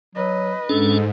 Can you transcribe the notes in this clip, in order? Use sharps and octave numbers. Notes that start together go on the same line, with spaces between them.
F#3 B4 D#5
G#2 C#4 D4 A4